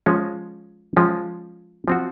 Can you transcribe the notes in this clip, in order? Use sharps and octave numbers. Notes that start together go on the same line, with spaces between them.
F3 G#3 C#4
F3 G#3 C#4
F3 C4 F#4